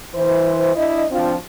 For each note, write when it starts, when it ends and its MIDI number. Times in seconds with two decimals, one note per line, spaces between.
0.15 0.75 52
0.15 0.75 72
0.75 1.05 62
0.75 1.05 64
0.75 1.05 75
1.11 1.33 53
1.11 1.33 60
1.11 1.33 62
1.11 1.33 65